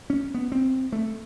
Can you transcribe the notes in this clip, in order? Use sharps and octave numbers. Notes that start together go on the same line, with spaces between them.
C#4
B3
C4
A3